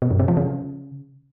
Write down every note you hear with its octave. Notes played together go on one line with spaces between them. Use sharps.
B2
F#2
C3
F3
C#3